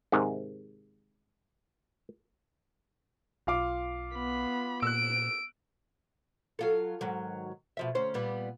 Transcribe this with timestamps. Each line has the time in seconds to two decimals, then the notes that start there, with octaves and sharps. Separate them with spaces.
0.12 G#2 C3 D#3
3.47 B1 F4 F5 D6
4.15 B3 B5
4.82 A#2 E6 F#6 D7
6.59 F#3 F4 A4
7.01 G#2 D#3 F#3
7.77 B2 F3 E5
7.95 D2 C#4 C5
8.14 A#2 G3 B3